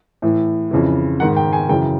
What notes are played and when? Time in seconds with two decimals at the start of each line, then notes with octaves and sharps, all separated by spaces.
0.22 A2 E3
0.71 F2 C#3 E3
1.20 G#2 D#3 F#5
1.37 G5
1.53 G#5
1.69 F#2 C#3 E3 G5